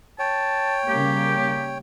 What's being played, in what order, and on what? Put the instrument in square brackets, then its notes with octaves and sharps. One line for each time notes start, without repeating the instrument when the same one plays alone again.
[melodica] C#5 G5 [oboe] A5
[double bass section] C#3 G3 A#3 [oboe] G4